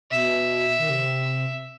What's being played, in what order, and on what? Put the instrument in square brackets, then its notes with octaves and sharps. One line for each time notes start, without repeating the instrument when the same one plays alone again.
[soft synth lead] B2 [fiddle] E5
[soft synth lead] D#3
C3